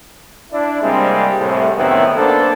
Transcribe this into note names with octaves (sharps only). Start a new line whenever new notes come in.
D4 E4
C3 G3 G#3 A#3 C4
C2 A2 C3
F#2 A2 D#3 B3 C4 E4
A#3 B3 D4 A4 C5